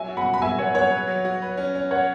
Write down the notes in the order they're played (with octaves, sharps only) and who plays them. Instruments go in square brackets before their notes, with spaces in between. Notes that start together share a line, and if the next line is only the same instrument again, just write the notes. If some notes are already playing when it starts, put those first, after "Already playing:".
Already playing: [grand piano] F#3 [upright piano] E5 G#5
[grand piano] F#4
[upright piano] F#5 B5
[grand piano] F#4
[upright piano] B5
[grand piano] F#4 [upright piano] E5 G#5
[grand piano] F#3 [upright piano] C#5 F#5
[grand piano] F#3 [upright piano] C#5 F#5
[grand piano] B4
F#3
F#4
B4
C#4
C#4
[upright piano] C#5 F#5